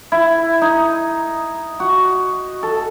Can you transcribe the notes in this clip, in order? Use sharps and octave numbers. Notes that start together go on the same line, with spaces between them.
E4
D#4
F#4
A4